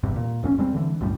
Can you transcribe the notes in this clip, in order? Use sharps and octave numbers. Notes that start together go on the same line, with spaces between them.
G1 E2 G2 C3
A#2
E1 F2 C4 C#4
E2 G3 G#3 C4
D3 E3
C2 F#2 A2 G3